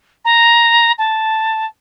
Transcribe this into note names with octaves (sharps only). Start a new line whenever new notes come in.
A#5
A5